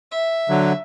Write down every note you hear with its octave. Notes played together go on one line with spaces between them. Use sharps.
E5
D3 F#3